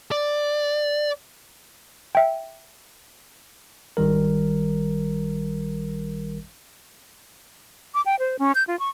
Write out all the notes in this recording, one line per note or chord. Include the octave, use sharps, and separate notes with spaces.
D5
E5 G5
G#1 D#3 G3 A#4
D6
G5
C5
C#4
G6
F4
C#6